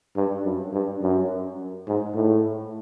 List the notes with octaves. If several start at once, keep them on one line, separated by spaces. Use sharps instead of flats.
G2
F#2
G2
F#2
G#2
A2